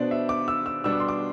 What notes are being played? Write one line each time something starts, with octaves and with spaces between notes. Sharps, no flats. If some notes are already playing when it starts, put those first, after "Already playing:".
Already playing: B2 B3 D4 C5 D5
E5
D6
E6
E6
B2 G3 B3 D4 E6
D6
C6
D6